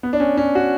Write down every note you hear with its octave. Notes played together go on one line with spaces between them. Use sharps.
B3
D4
C#4
C#4
F#4